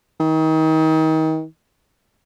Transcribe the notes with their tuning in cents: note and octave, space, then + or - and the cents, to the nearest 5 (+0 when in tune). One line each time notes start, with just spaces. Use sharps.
D#3 +30